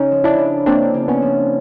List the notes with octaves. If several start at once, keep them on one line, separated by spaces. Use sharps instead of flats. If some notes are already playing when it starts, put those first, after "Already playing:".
Already playing: C#3 C#4 D#4
F3
D4 E4
C#3
A#3 C4 D4
C#3
B3 C#4
F3